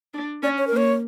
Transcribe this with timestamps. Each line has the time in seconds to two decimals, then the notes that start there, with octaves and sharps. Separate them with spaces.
0.14 D4
0.43 C#4 D5
0.58 C#5
0.67 A#4
0.72 A#3
0.77 C#5